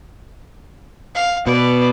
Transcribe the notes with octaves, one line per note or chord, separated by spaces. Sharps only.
F5
B2 B4 D5